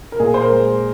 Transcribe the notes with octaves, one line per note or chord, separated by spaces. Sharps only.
A#4
A#2 G#4
C5
A#4
G#3